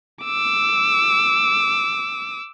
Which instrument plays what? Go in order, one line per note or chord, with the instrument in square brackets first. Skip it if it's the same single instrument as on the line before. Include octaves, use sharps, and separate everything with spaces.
[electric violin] D6 E6